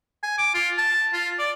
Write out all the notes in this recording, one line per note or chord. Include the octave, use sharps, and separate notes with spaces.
G#5
D6
F4
A5
F4
D5